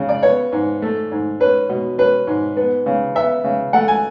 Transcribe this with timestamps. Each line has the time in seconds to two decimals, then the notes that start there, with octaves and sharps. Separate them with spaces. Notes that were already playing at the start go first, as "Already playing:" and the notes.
Already playing: C#3
0.09 D5
0.23 B3 C#5
0.52 G#2
0.82 A3
1.11 G#2
1.40 C#4 B4
1.69 B2
1.98 C#4 B4
2.27 G#2
2.57 B3
2.86 C#3
3.15 B3 E5
3.44 C#3
3.73 A3 F#5
3.88 G#5